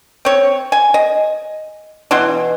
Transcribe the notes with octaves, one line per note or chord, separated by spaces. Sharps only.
C4 C#5
G#5
D#5
B2 E3 B3 C6